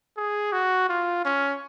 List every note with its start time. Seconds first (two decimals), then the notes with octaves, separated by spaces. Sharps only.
0.17 G#4
0.53 F#4
0.89 F4
1.25 C#4